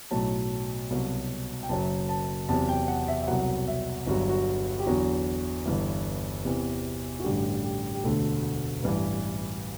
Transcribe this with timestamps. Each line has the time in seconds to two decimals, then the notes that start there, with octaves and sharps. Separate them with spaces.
0.11 B1 A2 F#3 A5
0.90 C2 B2 F#3
1.63 G5
1.69 F#1 F#2 F#3 A5
2.09 A5
2.49 E2 C3 F#3 A5
2.69 G5
2.88 F#5
3.08 E5
3.22 E5
3.27 C2 B2 F#3 F#5
3.68 E5
4.07 G1 G2 F#3 F#4
4.29 F#4
4.79 G4
4.86 E2 D3 F#3 F#4
5.65 G1 G2 E3
6.45 E2 C3 E3
7.20 F#4
7.24 A1 G2 D3 G4
7.64 G4
7.94 G4
8.03 E1 D2 D3 A4
8.82 A1 G2 E3 B4